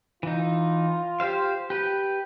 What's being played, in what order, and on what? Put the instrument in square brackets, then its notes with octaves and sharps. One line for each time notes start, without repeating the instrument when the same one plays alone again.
[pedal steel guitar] E3 D#4 [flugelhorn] F4
[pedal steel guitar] G4 C5 F5
G4 B4